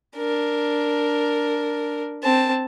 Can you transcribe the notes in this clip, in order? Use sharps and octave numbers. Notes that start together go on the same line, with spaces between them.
D4 A#4
C4 A5